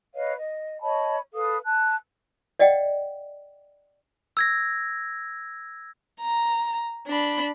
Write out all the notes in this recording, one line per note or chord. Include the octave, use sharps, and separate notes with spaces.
B4 C#5 D#5 F5
D#5
C#5 D#5 A5 B5
A4 B4 F5 D#6
A5 F#6
D5 D#5 F#5 G5
E6 G#6 A#6
A#5
D4 B5